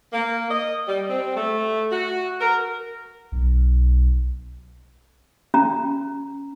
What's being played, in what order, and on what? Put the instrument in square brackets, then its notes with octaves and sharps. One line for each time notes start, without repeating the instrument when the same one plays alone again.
[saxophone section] A#3
D#5
G3
C4
A3
F#4
A#4
[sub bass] B1
[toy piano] C#4 A#5